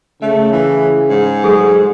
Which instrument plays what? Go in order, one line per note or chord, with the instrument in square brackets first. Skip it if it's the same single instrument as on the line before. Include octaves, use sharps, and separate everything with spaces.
[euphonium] C#3 [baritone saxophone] A3 [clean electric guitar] E5
[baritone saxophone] E3
G#2
[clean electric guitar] F#3 G#3 [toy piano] G#4 A4